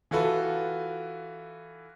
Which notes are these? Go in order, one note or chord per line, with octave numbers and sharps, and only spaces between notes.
E3 F4 F#4 A4 B4